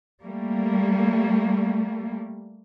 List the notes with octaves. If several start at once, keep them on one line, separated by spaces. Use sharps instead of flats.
G3 A3 A#3